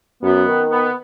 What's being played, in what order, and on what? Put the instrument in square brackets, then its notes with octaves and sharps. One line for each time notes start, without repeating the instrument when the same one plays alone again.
[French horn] F#2 [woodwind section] B3
[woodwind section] D#3
B3